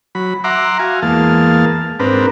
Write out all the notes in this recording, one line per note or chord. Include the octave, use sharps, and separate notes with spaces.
F#3 B5
E5 F#5 A#5 C6 D6
F#4 F5 G#5
E2 G#3 A#3 F5 A5
G#2 C4 D4 A#4 B4